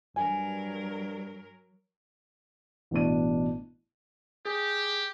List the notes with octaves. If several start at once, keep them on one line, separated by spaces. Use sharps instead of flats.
G2 F#3 A#4 G#5
A1 B2 D4 D#7
G4 G#4